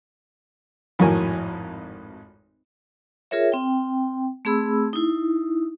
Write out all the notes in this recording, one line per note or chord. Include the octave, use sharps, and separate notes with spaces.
G#1 F2 A2 F#4 A#4 G#5
F4 G#4 A#4 C#5 E5
C4 G5
A3 C4 G#4 B5 E6
D#4 E4